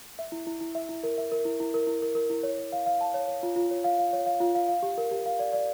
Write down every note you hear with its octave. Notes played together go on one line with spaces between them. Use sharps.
E5
E4
E4
E4
E5
E4
A#4
E5
A#4
E4
E4
A#4
E4
A#4
A#4
E4
C#5
C#5
F5
F5
A5
C#5
C#5
F4
F4
C#5
F5
F5
C#5
F5
F4
F5
F5
G4
A#4
G4
F5
D5
D5